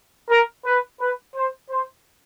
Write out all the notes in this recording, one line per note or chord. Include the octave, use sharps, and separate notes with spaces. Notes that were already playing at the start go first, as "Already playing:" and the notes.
A#4
B4
B4
C5
C5